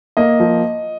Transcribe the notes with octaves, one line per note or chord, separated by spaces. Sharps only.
A#3 D#5
F3